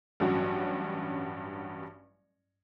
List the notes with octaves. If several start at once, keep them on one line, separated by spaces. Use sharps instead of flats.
A1 G2 F#3 C#4 F#4